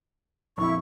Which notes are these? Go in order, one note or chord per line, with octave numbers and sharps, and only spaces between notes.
A#1 F2 E4 C#6